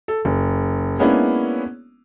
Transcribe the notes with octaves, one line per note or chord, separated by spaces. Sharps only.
A4
F#1
G#3 A#3 B3 C#4 D4 E4